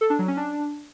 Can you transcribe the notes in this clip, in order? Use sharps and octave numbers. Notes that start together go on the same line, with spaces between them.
A4
D4
F#3
C#4
D4